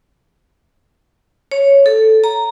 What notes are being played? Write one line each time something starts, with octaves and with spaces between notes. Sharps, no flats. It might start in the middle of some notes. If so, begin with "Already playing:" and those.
C#5
A4
A#5